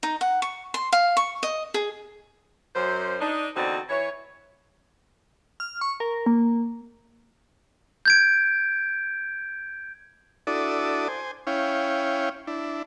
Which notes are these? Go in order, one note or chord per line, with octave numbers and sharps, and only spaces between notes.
D#4
F#5
C#6
C6
F5
C#6
D#5
G#4
F#2 C5
D4 D#4
E2 D3 C4 D#4 F#4 D5
E3 C#5
F6
C#6
A#4
A#3
G6 G#6 D7
D4 E4 F#4 A4 D5 D#6
C5 G#5
C#4 E4 C#5 F5 G5
D4 E4